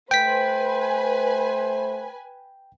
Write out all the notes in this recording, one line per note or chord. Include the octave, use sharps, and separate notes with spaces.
A3 B4 C5 G5 G#5 B6